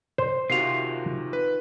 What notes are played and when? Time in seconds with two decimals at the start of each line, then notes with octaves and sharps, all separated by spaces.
0.18 C5
0.50 C3 D#3 F4 F#4 C7 F7
1.33 B4